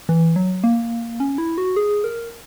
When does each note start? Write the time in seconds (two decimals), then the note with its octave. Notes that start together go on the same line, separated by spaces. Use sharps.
0.09 E3
0.36 F#3
0.64 A#3
1.20 C#4
1.38 E4
1.58 F#4
1.76 G#4
2.04 A#4